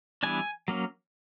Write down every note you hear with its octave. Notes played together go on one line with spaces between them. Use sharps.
E3 G3 B3 D4 G#5
F#3 A#3 C#4